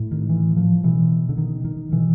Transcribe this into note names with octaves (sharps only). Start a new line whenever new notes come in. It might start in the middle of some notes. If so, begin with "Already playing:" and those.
Already playing: A2
D#3
E3
F3
B2 E3
D3
D#3
D#3
B2 E3